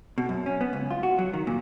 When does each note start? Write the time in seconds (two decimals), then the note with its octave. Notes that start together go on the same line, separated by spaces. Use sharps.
0.18 B2
0.29 F#2
0.46 C#4
0.61 B3
0.73 C#2
0.91 F4
1.03 F#4
1.19 F#3
1.34 D#3
1.47 A#2